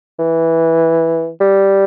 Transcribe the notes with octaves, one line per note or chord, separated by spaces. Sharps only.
E3
G3